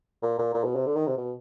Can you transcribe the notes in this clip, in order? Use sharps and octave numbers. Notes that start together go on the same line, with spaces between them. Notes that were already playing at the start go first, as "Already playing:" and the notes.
A#2
A#2
A#2
B2
C3
D3
D#3
C3
B2